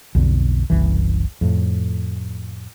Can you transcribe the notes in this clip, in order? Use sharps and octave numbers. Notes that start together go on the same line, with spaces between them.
B1 F2 D3
F#1 C2 E3
F2 A2